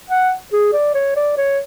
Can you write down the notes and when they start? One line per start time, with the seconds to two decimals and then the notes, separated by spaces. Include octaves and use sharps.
0.09 F#5
0.52 G#4
0.73 D5
0.94 C#5
1.16 D5
1.37 C#5